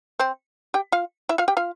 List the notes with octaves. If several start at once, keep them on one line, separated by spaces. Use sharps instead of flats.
C4 C5
G4 G5
F4 F5
E4 E5
F4 F5
G4 G5
F4 F5